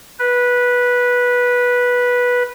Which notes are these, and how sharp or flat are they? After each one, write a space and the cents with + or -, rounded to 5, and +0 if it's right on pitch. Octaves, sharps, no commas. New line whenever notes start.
B4 -10